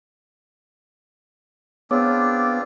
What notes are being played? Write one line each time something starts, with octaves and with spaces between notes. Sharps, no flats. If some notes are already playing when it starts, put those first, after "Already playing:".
B3 C4 D4 F4 G#4 C#5 D6